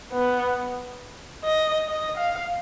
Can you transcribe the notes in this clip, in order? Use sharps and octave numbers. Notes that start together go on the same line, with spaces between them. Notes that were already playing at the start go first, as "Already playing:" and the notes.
B3
D#5
D#5
F5